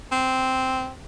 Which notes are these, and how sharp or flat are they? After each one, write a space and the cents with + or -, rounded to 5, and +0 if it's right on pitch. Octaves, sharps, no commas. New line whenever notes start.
C4 -5